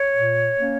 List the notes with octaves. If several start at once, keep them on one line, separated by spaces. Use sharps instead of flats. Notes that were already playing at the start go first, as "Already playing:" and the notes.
Already playing: C#5
A#2
A#3 C#4